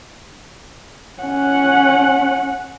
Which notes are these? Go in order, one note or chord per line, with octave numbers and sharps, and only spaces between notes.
C#4 F#5